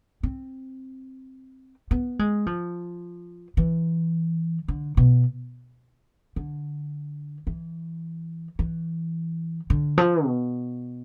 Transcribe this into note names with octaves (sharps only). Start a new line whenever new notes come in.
C4
B3
G#3
F3
E3
D3
B2
D3
E3
E3
D3
F3
B2